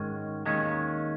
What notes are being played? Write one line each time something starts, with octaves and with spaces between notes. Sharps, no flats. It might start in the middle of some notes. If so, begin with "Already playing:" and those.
Already playing: G#2 D#3 G#3 C#4
D#2 D#3 G#3 C#4